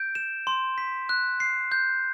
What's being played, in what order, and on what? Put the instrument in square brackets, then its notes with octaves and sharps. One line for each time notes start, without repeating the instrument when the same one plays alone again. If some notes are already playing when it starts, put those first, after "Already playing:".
Already playing: [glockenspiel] G6 D7
E7
C6
B6
F#6
C7
G6